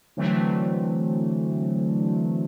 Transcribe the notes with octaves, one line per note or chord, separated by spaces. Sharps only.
D3 E3 F#3 A3 C4